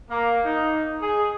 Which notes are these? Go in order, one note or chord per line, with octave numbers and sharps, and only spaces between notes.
A#3
D#4
G#4